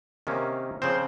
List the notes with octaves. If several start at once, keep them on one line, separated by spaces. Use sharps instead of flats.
C3 D#3 A#3 C#4
C#3 F3 C4 C5